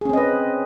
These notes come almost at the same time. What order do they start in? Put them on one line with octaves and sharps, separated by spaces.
G#4 C#4 C4 D#5 B4